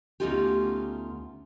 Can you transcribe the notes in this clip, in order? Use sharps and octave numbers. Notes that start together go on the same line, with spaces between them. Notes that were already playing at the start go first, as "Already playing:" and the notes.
D2 B3 C#4 D#4 F4 G4